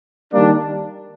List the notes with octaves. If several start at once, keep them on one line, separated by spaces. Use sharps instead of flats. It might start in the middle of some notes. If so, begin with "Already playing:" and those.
D#3 G3 A#3 D4